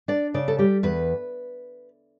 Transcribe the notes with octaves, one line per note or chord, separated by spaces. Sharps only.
D4 D5
C#3 D5
A4
G3 G4
E2 B4